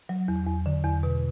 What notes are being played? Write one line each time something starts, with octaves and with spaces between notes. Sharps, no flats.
F#3
E2
E2
D3
E2
B2